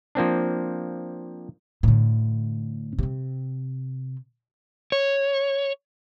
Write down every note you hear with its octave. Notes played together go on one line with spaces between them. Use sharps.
F3 A#3 C4 D4
A2 D3
C3 C4
C#5